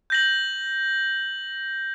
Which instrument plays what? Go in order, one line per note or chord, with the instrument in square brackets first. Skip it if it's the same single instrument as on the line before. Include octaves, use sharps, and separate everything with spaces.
[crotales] G6 A#6 F#7